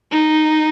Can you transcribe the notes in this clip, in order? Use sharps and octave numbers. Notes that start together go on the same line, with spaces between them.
D#4